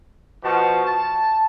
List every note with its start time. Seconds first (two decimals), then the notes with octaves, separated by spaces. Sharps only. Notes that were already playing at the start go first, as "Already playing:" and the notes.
0.43 B2 F3 F#4 A5
0.85 A5